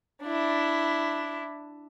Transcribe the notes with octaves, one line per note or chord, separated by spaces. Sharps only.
D4 E4